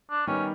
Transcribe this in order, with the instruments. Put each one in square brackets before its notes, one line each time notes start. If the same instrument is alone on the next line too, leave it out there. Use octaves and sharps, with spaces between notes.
[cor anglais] D4
[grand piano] D#3 G3 B3 D#4 [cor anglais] C#4